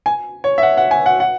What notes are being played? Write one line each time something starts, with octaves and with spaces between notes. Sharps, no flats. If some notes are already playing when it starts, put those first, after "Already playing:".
G#5
C#5
E5
F#5
F#5
G#5
F#5
F#5